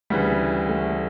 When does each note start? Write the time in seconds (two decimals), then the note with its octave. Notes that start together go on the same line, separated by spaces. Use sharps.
0.10 D2 C#3 E3 G3
0.69 A3